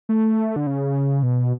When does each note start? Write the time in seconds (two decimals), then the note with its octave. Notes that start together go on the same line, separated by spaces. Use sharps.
0.09 A3
0.56 D3
0.67 C#3
1.23 B2